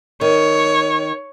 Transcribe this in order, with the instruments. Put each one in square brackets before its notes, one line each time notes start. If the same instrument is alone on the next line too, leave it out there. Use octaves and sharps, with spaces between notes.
[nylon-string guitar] D#3 [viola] C#5